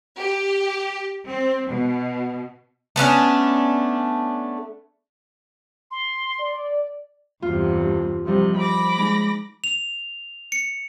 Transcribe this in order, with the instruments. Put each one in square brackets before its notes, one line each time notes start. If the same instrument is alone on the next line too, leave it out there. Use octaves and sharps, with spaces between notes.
[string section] G4
C4
B2
[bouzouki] A3 B3 C#4 D4
[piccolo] C6
[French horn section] D5
[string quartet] E2 G2 C3 [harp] F4
[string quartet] C3 [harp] F3 G3 D#4
[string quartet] B5 D6 A#6
[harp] G#3 D#4
[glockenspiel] F7
C#7